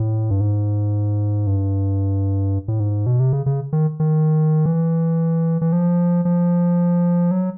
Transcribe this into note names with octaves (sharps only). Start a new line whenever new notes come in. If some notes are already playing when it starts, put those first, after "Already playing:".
Already playing: A2
G2
G#2
G2
A2
G#2
B2
C3
C#3
C#3
D#3
D#3
E3
E3
F3
F3
F#3